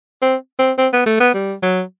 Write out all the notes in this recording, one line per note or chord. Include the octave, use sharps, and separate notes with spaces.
C4
C4
C4
B3
A3
B3
G3
F#3